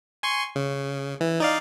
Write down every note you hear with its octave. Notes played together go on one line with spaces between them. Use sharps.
G#5 C6 C#6
C#3
E3
D#4 D5 F5